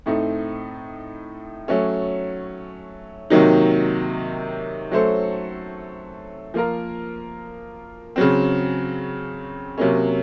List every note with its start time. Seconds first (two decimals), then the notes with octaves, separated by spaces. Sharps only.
0.06 A2 A3 C4 D#4
1.68 F#3 A3 C#4
3.30 C3 D#3 F#3 A#3 D#4
4.91 F#3 A3 C#4 A4 C5
6.54 F3 A#3 F4 A#4
8.16 C#3 F#3 C4
9.78 C3 F#3 A#3 C#4